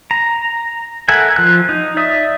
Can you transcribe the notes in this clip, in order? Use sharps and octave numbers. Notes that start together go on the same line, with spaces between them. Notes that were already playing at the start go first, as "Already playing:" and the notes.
A#5
A4 A#4 E5 F#5 G#5
F3 F#6
D#4
D5 E5 D#6